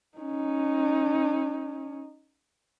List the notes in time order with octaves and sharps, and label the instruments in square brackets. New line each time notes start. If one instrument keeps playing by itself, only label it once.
[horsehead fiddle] C#4 D#4